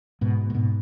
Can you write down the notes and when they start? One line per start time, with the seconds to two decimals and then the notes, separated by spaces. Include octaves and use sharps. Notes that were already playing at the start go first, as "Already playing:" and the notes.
0.21 G#2 B2
0.50 A#2
0.55 G#2 B2